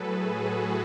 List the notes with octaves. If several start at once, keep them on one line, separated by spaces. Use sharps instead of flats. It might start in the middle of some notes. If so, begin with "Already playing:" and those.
Already playing: A2 F#3 G#4 A4 B4
F#4